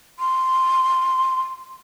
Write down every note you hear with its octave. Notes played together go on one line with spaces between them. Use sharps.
C6